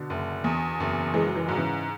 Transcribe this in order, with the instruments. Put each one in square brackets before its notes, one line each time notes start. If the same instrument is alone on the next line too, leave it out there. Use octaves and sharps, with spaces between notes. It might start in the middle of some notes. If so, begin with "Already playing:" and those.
Already playing: [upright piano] B2 D3
[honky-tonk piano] F#1
E2
F#1
[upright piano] E3 [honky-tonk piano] G#3
[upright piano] F#3
E3
[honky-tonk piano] G#2 [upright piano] F#3
[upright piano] C#3 E3